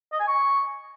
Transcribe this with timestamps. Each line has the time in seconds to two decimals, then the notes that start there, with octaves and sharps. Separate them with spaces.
0.13 D#5
0.20 G#5
0.28 C#6